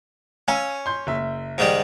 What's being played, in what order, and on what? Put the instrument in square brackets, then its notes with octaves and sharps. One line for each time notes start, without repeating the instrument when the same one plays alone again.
[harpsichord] C#4 [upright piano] F5 G#5 E6
[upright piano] C6 G6
F#1 E5
[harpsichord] G#2 D#3 G3